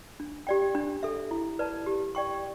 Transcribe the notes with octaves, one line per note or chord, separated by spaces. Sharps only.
D4
G4 D5 G5
D4
A4 E5
E4
B4 D5 A5
G4
D5 G5 C#6